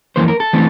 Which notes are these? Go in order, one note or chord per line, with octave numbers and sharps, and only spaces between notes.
F2 E3 A#3 C5
A#4
A4
E3 A3 C4